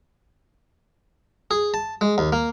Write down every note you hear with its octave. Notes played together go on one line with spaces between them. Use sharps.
G#4
A5
G#3
D#2
A#3